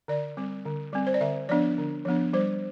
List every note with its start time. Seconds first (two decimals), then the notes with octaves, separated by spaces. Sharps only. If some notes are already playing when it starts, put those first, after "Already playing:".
0.08 D3 D5
0.37 G3 C4
0.66 D3
0.93 G3 C4
1.07 C5
1.14 D5
1.21 D3 E5
1.49 F3 B3 D4 D5
1.78 D3
2.05 F3 B3 D4
2.33 G3 C5